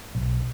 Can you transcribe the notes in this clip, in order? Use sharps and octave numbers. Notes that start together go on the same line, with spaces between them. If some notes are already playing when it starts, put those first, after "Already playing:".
B1